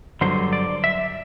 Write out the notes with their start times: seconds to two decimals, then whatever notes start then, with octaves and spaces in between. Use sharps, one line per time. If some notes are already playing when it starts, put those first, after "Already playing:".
0.21 G2 D3 F#3 C5
0.53 D5
0.84 E5